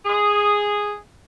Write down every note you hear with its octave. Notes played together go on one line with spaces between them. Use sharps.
G#4